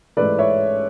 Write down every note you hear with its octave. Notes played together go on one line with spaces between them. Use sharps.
A1 G#2 E3 A3 B4 D5
C#5 E5